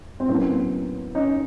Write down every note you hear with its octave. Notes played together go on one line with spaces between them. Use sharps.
C4
A2 F#3 A#3 B3 C#4
C#4 D#4